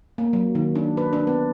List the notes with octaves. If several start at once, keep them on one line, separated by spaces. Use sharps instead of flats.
A#3
F#3
D#3
D4
B4
D4
B3